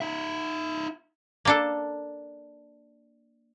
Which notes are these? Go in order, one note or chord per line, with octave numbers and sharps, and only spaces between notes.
D#4 E5
A#3 D4 A4